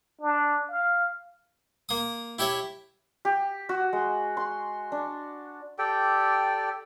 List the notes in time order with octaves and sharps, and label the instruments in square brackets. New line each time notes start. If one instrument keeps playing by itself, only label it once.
[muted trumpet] D4
F5
[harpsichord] A#3 D#6
E4 G4 C#5 E5
[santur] G4
F#4
G#3
C6
D4
[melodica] G4 A4 D5 G5